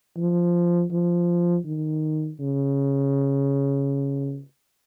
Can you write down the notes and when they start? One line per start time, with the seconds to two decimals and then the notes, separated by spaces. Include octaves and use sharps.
0.17 F3
0.91 F3
1.65 D#3
2.40 C#3